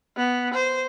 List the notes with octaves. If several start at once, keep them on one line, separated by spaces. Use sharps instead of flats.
B3
C5